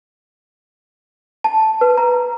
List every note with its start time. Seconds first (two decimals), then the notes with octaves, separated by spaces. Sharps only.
1.44 A5
1.81 B4
1.98 A#5